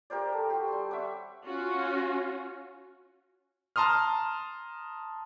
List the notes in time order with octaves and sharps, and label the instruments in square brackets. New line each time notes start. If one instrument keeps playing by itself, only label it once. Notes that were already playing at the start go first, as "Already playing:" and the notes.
[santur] G4 A#4 C5 D5
A4
F#4 G4
G3 C6
E5 F#5 C#6 D6
[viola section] C#4 F4 F#4
[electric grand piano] A5 A#5 C6 D#6 F6